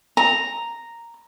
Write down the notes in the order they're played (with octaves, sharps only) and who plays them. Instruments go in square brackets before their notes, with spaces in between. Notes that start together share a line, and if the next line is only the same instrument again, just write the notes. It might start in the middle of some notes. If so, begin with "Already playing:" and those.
[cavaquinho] A#5